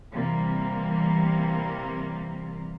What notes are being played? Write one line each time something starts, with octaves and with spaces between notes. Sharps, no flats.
C3 E3 G3 A#3